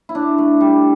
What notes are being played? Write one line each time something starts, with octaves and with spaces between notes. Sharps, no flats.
E4
D4
A3
G3